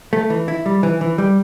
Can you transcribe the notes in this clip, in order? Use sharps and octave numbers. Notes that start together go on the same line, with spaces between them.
A3
E3
E4
G3
E3
E3
G3